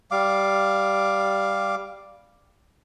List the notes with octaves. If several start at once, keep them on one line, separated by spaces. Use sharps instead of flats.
G3 F5 D6